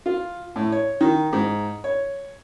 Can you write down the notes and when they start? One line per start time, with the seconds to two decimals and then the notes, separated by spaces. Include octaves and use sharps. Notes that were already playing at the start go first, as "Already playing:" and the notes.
0.06 F4
0.56 A2
0.72 C#5
1.01 D#3
1.33 G#2
1.84 C#5